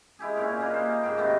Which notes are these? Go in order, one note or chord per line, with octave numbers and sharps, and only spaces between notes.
G#3 E4 G4 G#4
A#2 C4 C#4 F5
A#3 F4 B4 D#5
C5
G#2 C#3 G5
C3 D#3 A3 B3